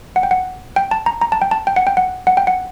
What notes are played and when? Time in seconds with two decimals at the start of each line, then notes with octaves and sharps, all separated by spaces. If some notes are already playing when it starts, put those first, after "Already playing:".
0.16 F#5
0.23 G5
0.31 F#5
0.76 G5
0.91 A5
1.06 A#5
1.21 A#5
1.32 A5
1.42 G5
1.51 A5
1.67 G5
1.76 F#5
1.87 G5
1.97 F#5
2.27 F#5
2.37 G5
2.47 F#5